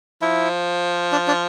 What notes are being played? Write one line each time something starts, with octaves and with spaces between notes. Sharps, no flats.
F3 E4
D4
D4